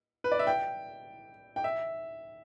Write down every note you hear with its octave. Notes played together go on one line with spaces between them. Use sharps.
B4
D5
E5
G5
G5
E5